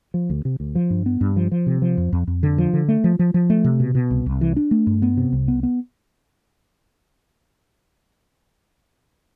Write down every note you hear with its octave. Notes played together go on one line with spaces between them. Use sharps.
F3
D2
C3
D2
F3
G2
B3
G2
F3
F3
C3
F3
F2
F2
F2
D3
F3
D3
A3
F3
F3
F3
A3
C3
B2
B2
C2
C2
E3
D4
A3
G2
B3
C3
C2
B3
B3